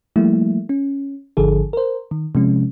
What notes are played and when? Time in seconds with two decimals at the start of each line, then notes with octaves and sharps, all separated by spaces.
0.16 F3 G3 A3 A#3 E4
0.69 C#4
1.37 G#1 D3 F3 G#4 A4
1.73 A#4 C5
2.11 D#3
2.35 C3 F3 G#3 C#4